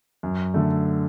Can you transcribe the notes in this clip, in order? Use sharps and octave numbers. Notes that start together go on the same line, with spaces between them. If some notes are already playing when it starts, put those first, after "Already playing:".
F#2
D3 A3